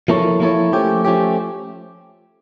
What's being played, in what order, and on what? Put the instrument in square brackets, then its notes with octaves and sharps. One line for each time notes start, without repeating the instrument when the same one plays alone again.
[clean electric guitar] F3 A#3 E4 A4 C#5
F3 A#3 E4 A4 C#5
F3 A3 C#4 G4
F3 A3 C#4 G4